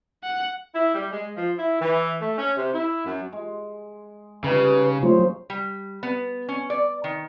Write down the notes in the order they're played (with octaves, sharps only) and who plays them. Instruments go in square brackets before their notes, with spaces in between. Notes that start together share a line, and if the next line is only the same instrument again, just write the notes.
[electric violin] F#5
[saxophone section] E4
G3
G#3
F3
E4
E3
A3
C#4
C3
E4
F#2
[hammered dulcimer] G#3
[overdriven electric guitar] C#3 [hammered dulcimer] G3 D#4 [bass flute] B4
[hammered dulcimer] C#3 C#5 [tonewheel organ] F#3 A3 F4 [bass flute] C5
[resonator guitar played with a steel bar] G3
B3
C#4
D5
D#3